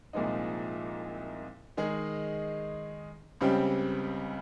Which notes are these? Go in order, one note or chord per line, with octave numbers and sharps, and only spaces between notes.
C2 A#2 F3 G#3 D#4
D#3 G#3 D#4 G#4
C#2 C#3 G3 C4 G4